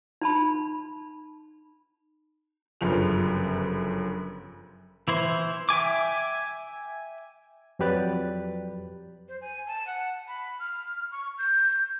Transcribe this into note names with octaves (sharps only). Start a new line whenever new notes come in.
D#4 A5 B5
G1 F#2 C#3 F3 F7
E3 E4 C5
E5 G5 G#5 D6
F2 F#3 G4 B4 D5 A6
C5
G#5
A5
F#5
B5
F6
C#6
G6